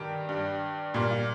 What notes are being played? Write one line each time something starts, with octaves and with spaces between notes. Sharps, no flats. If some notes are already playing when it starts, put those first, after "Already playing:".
Already playing: G2 D#3 G3 G4
G2 G3
A#2 G3 F4
F4